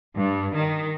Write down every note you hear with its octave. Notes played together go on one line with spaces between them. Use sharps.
G2
D#3